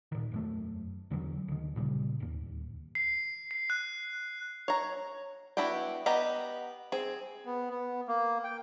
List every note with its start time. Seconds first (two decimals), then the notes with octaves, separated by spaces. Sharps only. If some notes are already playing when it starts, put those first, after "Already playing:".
0.12 A#2 D#3
0.31 E1 F#2 A3
1.10 E2 D3 E3 F#3
1.48 D2 D#3
1.76 A#2 C#3 G3
2.20 D1 D#2
2.95 C7
3.51 C7
3.70 F#6
4.68 C#5 A#5
5.57 B3 D4 E4 F#4 G5
6.06 B3 G4 D#5 A#5
6.92 C4 G#4
7.46 B3
7.71 B3
8.08 A#3
8.44 G5